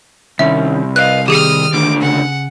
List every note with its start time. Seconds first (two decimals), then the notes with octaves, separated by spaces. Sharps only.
0.39 C2 D#3 C#4 E5
0.96 B4 D5 D#5 F5 F#6
1.28 D#3 G4 G#4 D#6 F6
1.73 D#2 D3 D6
2.02 C#3 F#5